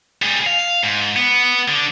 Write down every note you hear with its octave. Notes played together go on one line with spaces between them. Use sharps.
G3 G#4
F5
G#2
B3
D3